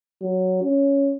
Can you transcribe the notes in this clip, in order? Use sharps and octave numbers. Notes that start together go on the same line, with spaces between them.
F#3
C#4